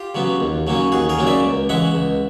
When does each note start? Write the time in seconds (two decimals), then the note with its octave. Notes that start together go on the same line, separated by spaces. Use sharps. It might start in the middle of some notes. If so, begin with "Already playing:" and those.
Already playing: F4 G4
0.15 C#3 F#3 B3
0.40 D#2
0.67 C#3 F#3 A#3 C#4
0.92 D#2 F#4 G#4
1.09 G#4 A#4
1.17 C#3 F#3 A#3 C#4
1.27 D5 E5
1.43 C#2
1.69 C#3 E3 G#3 E5 F#5
1.95 C#2